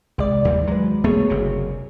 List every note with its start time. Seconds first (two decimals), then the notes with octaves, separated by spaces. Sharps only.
0.18 C2 G#3 D5
0.45 D#2 D#3 E3 G3
0.67 F#3 G#3 B4
1.04 C#2 A3 B3 G#4 C#5
1.30 F#1 C3